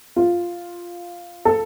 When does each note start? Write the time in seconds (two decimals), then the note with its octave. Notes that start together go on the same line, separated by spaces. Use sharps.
0.16 F4
1.45 A4